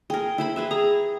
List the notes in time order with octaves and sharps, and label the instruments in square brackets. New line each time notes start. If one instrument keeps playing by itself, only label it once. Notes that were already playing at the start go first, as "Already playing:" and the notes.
[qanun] G#4 A#4 [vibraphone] G5
[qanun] E4 C5 B5
G#4 B4 E5
[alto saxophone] G#4 [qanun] A#5